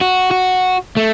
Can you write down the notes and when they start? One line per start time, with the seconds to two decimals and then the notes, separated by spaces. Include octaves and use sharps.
0.01 F#4
0.31 F#4
0.97 A3